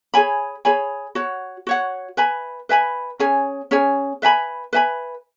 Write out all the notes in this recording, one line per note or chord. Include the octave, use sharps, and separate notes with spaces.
G#4 C#5 G#5 B5
G#4 C#5 G#5 B5
F#4 C#5 F#5
F#4 C#5 F#5
B4 E5 G#5 B5
B4 E5 G#5 B5
C#4 G#4 C#5 G#5
C#4 G#4 C#5 G#5
B4 E5 G#5 B5
B4 E5 G#5 B5